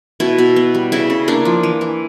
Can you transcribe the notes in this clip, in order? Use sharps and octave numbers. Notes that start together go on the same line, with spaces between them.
B2 E4
B2
B3
G3
C#3 E4
C#3
A#3 D4
F3
E3
E3